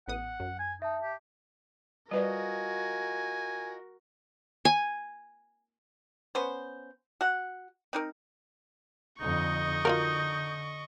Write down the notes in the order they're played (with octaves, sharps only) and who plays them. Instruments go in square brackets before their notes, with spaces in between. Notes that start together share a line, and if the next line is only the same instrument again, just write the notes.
[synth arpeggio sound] A1 B3 D#6 [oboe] F#5
[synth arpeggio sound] F#2
[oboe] G#5
[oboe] D#4 [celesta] E5 A5
[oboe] G4
[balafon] G3 B4 D5 [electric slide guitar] F4 D#5 [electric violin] F#4 A#4 [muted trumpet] G#5
[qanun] G#5
[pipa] B3 C#4 C5
F#4 F#5
C4 D#4 A#4
[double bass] F2 D3 [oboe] D#4 [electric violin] D#5 C#6
[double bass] D3 [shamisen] F4 F#4 A#4